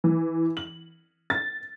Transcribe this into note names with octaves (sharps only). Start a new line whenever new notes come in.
E3
F#7
A6